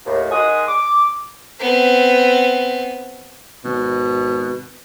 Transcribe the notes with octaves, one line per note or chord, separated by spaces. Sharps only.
D#2 A2
D#3 G#3 F#5 G#5 C6 D#6
D6
B3 C4
G#1 B2